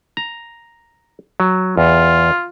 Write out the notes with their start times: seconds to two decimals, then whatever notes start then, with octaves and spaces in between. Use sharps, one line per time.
0.17 A#5
1.40 F#3
1.77 E2 F4